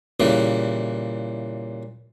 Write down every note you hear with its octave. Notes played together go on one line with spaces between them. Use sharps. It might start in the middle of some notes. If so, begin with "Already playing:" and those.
A#2 C#3 E3 G3